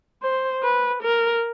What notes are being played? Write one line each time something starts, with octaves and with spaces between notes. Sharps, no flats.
C5
B4
A#4